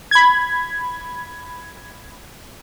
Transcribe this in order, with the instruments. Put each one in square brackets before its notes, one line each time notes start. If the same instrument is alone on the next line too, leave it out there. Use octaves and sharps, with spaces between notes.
[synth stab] B5 G#6